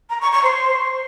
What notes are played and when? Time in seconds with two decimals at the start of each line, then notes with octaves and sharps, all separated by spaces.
0.09 A#5
0.21 C#6
0.32 C#6
0.43 C5